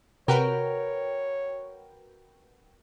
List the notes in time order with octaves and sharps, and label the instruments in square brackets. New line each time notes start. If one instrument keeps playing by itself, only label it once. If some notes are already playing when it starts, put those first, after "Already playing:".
[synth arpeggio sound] C3 [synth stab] F#4 B4 G5 [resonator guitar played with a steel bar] A#4 [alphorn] C#5